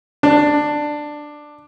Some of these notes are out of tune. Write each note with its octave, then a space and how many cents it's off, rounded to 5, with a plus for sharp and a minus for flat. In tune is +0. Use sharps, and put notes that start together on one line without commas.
D4 +10